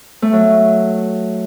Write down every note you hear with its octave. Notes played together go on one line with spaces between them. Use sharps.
A3
F#3